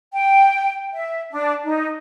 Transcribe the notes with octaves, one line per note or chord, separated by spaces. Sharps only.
G5
E5
D4
D#4